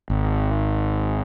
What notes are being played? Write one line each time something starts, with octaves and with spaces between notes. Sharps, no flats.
G#1